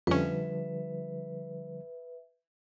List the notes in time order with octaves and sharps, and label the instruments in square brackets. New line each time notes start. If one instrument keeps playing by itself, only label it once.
[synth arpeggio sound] F2 C#4 [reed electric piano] D3 F3 G3 [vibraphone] B4 E5